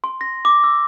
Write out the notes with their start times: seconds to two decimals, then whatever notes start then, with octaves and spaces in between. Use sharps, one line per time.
0.04 C6
0.21 A#6
0.45 D6
0.64 E6